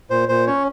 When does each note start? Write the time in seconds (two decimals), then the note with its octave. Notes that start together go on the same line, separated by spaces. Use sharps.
0.10 A#2 C5
0.29 A#2 C5
0.47 C#4 C#5